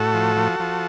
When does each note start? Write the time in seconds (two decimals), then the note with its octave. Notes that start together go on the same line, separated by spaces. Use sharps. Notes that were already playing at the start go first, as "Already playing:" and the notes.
Already playing: A2 F#4 A4
0.14 F3
0.37 F3
0.60 F3